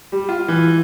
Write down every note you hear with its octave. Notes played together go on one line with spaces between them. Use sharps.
G3
F4
E3